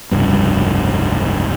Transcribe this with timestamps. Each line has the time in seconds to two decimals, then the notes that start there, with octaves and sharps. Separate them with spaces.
0.11 F1 C#2 G2